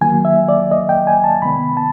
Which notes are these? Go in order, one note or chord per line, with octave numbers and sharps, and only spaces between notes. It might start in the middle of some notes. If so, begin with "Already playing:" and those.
D#3 F#3 A#3 G#5
E5
D5
D#5
G5
G#5
A5
C3 D#3 G#3 B3 B5
A5